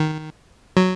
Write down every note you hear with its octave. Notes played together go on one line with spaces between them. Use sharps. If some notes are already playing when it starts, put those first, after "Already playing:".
Already playing: D#3
F#3